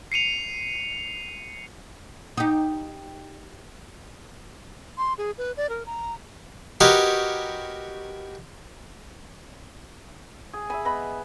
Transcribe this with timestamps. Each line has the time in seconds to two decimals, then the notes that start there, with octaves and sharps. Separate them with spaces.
0.12 C7 C#7 D#7 F7
2.37 D#4 G4
4.98 C6
5.18 G#4
5.38 B4
5.57 D5
5.69 A#4
5.86 A#5
6.80 F#4 G4 A#4 B4 C#5 D#5
10.53 G#4
10.70 E5 G#5 B5
10.85 B3 D#5 B5